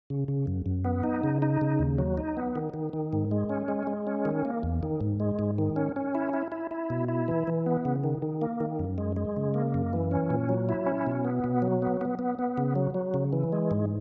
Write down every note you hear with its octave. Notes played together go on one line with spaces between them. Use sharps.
C#3
C#3
F#2
F#2
B3
D#4
C#3
D#4
C#3
D#2
F#3
D#4
B3
D#3
D#3
D#3
G#2
G#3
C#4
G#3
G#3
C#4
D#3
A#3
E2
D#3
G#2
G#3
G#2
D#3
C#4
C#4
E4
E4
E4
E4
B2
E4
E3
E3
B3
C#3
D#3
D#3
A#3
D#3
F#2
G#3
G#3
C#3
A#3
F#2
E3
C#4
A#2
F#3
E4
C#4
B2
B3
B2
F#3
B3
B3
B3
B3
C#3
F#3
F#3
C#3
E3
G#3
G#2